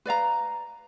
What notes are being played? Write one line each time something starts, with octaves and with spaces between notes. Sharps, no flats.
B4 D5 F5 A#5